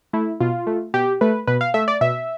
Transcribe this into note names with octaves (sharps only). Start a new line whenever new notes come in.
A3 E4
B2 F4
A3
B2 G4
A3 B4
B2 B4
F5
A3 E5
D5
B2 E5